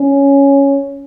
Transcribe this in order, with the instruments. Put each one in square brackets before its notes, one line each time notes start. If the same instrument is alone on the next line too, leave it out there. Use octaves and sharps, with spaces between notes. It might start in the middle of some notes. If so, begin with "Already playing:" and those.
Already playing: [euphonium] C#4